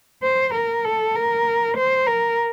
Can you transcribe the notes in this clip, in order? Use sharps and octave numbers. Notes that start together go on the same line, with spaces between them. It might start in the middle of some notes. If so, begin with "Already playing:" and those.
C5
A#4
A4
A#4
C5
A#4